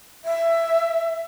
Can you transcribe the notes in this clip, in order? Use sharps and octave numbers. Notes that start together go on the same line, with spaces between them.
E5